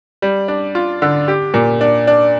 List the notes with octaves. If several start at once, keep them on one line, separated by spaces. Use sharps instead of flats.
G3
D4
F4
D3
G4
A#2
D4
D4